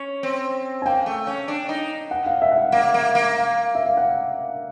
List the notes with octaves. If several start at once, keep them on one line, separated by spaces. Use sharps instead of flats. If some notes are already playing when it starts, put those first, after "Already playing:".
Already playing: C#4
C4
G#5
A#3 G5
A3
C#4
D4
D#4
F#5
F5
E5
F#5
F5
A#3 F5
A#3
A#3
E5
F5
F#5